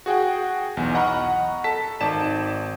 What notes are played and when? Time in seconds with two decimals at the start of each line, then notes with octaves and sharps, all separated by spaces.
0.06 F#4 G#4 F#5 G5
0.77 B1 E2
0.94 D#5 F#5 A#5 B5 C#6 F6
1.64 A4 A5 B6
2.01 G#1 D#4 D5 A5 E7